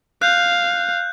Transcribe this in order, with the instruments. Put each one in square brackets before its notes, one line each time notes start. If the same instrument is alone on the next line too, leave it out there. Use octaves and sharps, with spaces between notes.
[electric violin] F5 [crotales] F#6 G6